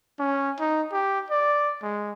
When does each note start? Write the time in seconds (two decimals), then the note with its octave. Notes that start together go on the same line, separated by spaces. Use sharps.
0.19 C#4
0.60 D#4
0.92 G4
1.30 D5
1.82 G#3